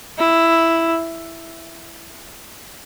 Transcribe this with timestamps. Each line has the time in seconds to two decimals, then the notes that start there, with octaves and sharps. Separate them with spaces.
0.18 E4